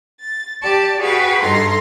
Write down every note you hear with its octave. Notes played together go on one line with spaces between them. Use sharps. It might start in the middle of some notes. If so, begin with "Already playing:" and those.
A6
G4 D5 A5
F#4 G#4 B4 F5 G5
G2 D#4 A4 A#5 C6